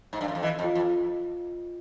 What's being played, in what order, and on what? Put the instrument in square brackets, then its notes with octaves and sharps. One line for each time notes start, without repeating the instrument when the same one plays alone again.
[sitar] G#2
G2
F#2
F2
[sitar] E3 [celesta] D#5
[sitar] F2
[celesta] F4
[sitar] F2
[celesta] F4